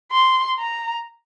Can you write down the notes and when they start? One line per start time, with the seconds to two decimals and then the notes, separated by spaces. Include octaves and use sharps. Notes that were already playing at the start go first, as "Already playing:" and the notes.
0.12 C6
0.58 A#5